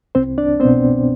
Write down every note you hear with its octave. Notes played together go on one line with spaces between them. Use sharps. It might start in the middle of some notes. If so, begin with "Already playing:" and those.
C2 C4 C5
D4 D5
B3 C4 C5
B2